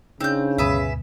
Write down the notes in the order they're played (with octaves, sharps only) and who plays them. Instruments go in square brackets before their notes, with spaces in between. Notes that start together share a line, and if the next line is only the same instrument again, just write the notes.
[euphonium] C#3 [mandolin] C4 G6 [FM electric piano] D4 D#4
[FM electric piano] D2 G2 B2 [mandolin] G#4 B4 E5